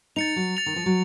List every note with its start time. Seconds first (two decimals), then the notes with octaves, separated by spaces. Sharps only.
0.16 D#4 A6 C#7 F7
0.36 F#3
0.57 A6 C#7 F7
0.66 D#3
0.76 F3
0.86 F#3